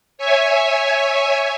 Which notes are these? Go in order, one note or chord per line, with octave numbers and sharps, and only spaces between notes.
C#5 E5 G#5